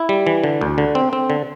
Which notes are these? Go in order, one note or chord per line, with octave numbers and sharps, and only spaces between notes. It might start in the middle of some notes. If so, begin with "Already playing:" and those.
Already playing: E4
G3
E3
D3
D2
D3
C4
C4
D3